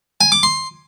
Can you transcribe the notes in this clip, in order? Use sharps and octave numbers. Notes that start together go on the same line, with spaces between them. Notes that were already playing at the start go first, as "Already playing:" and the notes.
G#5
D6
C6